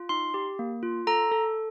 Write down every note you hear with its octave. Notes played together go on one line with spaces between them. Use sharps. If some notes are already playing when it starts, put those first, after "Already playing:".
Already playing: F4
D#4 C6
G4
A#3
F4
A4 A#5
A4